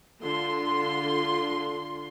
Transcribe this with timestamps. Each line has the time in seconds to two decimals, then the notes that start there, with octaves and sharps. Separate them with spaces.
0.20 D3 F4 C6